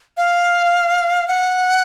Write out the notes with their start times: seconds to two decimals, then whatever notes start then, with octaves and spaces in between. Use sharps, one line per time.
0.17 F5
1.28 F#5